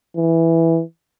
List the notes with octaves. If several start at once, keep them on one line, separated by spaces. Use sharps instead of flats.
E3